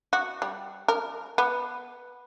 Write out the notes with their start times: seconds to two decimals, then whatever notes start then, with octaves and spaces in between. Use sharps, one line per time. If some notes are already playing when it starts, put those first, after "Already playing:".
0.13 F#4
0.42 G3
0.88 A#4
1.38 B3